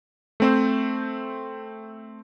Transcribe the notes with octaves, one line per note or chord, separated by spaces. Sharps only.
A3 C4 C5